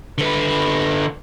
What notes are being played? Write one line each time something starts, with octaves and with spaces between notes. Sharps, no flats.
D3 B4